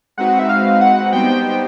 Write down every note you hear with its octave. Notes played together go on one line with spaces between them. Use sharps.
G#3 C4 D#4 F#4 B4 F#5
E5
F5
F#5
G3 B3 D#4 G4 C5 G5